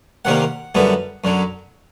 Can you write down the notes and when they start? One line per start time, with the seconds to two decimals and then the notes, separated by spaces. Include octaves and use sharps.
0.25 C2 C3 D#3 G3 A#3 F#5
0.75 F#2 D3 G3 B3 E4
1.24 F#2 D3 F#3